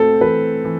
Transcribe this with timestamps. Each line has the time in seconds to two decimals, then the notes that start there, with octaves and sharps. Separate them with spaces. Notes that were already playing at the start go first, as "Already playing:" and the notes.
Already playing: A3 C4 A4
0.20 E3 B4
0.64 E3